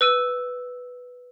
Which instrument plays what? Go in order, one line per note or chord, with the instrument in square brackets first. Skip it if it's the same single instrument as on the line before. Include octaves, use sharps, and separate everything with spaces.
[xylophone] B4 E6 D#7